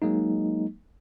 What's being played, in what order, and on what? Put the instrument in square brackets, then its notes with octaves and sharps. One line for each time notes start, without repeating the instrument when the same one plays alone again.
[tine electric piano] F#3 G#3 A#3 D#4